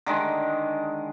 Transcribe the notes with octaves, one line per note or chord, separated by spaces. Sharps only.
D3 D#3 G#3